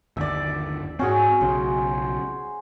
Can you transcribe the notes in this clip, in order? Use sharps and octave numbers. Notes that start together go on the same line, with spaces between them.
G1 D#2 D5 E5
G#2 C4 C#4 F#4 G#4
B1 C#3 C5